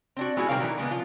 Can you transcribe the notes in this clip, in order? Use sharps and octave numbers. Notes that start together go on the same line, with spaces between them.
C4 D4 F#4
G#3 B3 E4 F#4 G#4
C3 D#3 G3 C4 A#4 F5
D#3 E3 F#3 A3 E4
C#3 G#3 A#3 B3
F3 F4